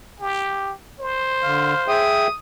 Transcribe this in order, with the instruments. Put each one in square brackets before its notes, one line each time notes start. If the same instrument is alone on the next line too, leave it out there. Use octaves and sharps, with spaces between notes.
[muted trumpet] G4
C5
[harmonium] D3 [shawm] F5
[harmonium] G#4 E5 G5 [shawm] D#6